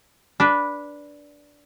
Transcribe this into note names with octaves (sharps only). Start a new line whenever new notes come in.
D4 B4 D5